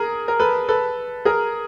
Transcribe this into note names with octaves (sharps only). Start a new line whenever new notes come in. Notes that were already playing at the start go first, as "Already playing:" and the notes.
Already playing: G#4 A#4
A#4
A4 B4
A4 B4
G#4 A#4